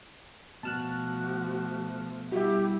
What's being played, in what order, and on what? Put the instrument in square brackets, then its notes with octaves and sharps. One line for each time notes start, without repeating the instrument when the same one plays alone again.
[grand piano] B2 E7 [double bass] F3 A3 [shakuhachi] F#4 [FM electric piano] A5 F6 F#6
[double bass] G3 E4 [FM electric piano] F#4 E5 [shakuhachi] G4